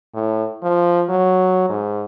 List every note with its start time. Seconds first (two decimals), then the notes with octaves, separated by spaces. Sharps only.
0.14 A2
0.63 F3
1.09 F#3
1.69 G#2